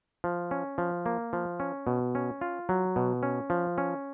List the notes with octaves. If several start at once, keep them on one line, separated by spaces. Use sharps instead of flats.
F3
C#4
F3
A#3
F3
C#4
B2
C#4
F4
F#3
B2
C#4
F3
C#4